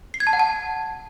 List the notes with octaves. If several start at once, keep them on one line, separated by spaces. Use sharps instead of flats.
C7
G#6
A5
F#5
A5